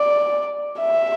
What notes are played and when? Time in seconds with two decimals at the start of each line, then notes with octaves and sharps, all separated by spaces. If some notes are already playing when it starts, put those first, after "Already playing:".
Already playing: D5
0.81 E5